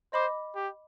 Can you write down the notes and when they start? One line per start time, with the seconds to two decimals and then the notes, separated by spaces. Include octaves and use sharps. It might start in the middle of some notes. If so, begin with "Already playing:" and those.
0.13 C5 D#5 B5 D6
0.55 G4